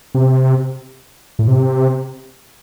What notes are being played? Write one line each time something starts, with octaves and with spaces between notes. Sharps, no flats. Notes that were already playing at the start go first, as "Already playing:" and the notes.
C3
A2
C3